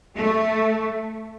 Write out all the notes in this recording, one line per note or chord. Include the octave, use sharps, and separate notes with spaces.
A3